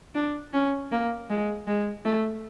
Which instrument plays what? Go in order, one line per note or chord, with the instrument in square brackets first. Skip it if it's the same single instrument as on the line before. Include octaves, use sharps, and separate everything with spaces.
[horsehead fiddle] D4
C#4
A#3
G#3
G#3
A3